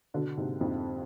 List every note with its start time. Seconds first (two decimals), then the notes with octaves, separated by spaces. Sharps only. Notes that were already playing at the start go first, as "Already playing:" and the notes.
0.14 B2 D3
0.37 G#2 C3
0.61 F2 G#2